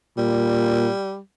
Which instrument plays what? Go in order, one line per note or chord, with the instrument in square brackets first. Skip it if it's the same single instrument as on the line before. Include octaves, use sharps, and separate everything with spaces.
[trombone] A#2 [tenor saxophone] G3